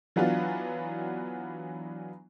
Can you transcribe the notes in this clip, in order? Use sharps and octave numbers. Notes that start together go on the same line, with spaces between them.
E3 F#3 B3 D4 F4